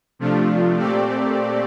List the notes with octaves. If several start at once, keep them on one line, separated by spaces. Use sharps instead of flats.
C3 F3 A3 D4 F4
A#2 A3 C4 G4 D5